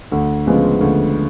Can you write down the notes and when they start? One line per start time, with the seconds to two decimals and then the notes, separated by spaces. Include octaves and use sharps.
0.12 D2
0.46 C#3 F3 G#3 B3
0.81 D2